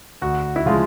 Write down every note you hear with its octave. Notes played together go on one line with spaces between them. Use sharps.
D2 F#4
E4
C#3 F3 G#3 F4